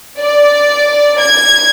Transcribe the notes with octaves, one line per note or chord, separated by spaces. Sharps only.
D5
G#6